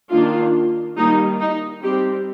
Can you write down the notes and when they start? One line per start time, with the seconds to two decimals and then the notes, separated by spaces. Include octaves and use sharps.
0.11 D#3 A#3 D4 F4
0.96 D#3 G3 A#3 D#4
1.39 D#4
1.82 G3 C4 G4